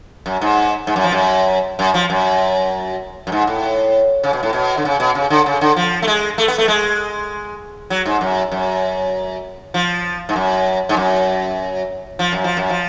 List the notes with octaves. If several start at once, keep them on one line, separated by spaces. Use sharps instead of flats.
F#2
G#2
G#2
F#2
F3
F#2
F#2
F3
F#2
F#2
G#2
A2
C#3
B2
A2
B2
D3
C#3
B2
C#3
D3
C#3
D3
F3
A3
G#3
A3
B3
A3
G#3
F#3
G#2
F#2
F#2
F3
G#2
F#2
G#2
F#2
F3
F#2
F3
F#2
F3